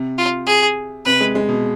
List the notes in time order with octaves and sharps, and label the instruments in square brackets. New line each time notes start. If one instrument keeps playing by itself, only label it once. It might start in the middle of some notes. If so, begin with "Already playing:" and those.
Already playing: [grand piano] C3
[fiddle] F4
G#4
[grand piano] C3 [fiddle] B4
[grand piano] G#3
G#3
B2